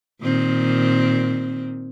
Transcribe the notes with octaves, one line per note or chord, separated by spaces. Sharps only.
A#2 D#3 C4